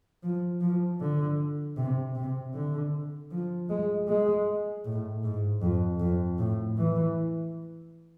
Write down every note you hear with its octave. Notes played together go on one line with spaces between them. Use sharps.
F3
F3
D3
C3
C3
D3
F3
G#3
G#3
A2
G#2
F2
F2
A2
E3